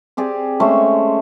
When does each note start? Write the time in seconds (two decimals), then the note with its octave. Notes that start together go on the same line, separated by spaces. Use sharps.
0.17 C4 G4 G#4 D5
0.60 G#3 A3 C#4 C5